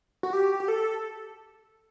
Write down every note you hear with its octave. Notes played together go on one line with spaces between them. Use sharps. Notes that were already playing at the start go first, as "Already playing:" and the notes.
F#4
G4
G4
A4